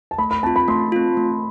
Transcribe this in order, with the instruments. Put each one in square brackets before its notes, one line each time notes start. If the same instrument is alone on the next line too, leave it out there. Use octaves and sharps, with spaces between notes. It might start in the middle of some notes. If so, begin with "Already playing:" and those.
[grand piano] A5
[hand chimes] A3 [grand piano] B5
[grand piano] B5
[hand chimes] C4 F4 [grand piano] A5
[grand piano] B5
[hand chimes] A3 [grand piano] C6
[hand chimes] C4 F4
A3